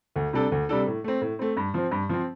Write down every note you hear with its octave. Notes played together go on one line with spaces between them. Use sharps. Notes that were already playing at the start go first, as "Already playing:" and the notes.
D2
C3 G3 D4 A4
D2
C3 G3 D4 A4
A2
A3 C4
A2
A3 C4
G2
F3 C4
G2
F3 C4